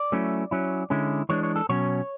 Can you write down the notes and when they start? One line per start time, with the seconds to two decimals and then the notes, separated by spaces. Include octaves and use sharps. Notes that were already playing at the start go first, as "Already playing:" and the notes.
Already playing: D5
0.12 F#3 A3 C#4 E4
0.51 F#3 C#4 E4
0.90 D3 G#3 C#4 E4
1.29 E3 G#3 D4 C#5
1.43 C#5
1.56 A4
1.69 B2 F#3 C#4 C#5